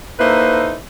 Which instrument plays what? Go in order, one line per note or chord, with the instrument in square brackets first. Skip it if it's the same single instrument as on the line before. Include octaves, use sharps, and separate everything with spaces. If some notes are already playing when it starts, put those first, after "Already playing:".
[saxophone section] A#3 D#4 E4 A4 B4 C5